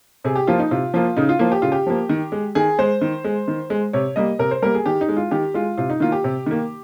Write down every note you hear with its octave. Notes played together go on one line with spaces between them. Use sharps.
C3 G#4
G4
F3 A#3 F4
D#4
C3 F4
F3 A#3 F4
C#3 D#4
F4
F3 A#3 F4
G4
C#3 F4
G4
F3 A#3
D#3
G#3
D#3 G#4
G#3 C5
D#3
G#3
D#3
G#3
C3 C#5
G3 A#3 D#5
C3 A#4
C5
G3 A#3 A#4
G#4
D#3 G4
D#4
G#3
F4
D#3 G4
G#3 F4
C3 F4
D#4
D#3 A#3 F4
G4
C3
D#3 A#3